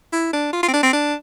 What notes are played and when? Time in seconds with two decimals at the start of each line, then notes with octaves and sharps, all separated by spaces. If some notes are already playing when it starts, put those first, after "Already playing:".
0.13 E4
0.33 D4
0.53 F4
0.63 F4
0.68 C4
0.73 D4
0.83 C4
0.93 D4